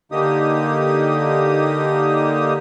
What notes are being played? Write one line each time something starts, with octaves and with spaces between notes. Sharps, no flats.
D3 A#3 D#4 G4 D#6